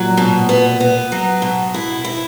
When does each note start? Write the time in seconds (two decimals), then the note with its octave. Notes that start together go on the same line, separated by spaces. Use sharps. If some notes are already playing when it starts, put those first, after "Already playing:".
Already playing: A#2 F#3
0.17 B2
0.49 B3
0.80 B3
1.12 F#3
1.42 B2
1.74 E4
2.04 E4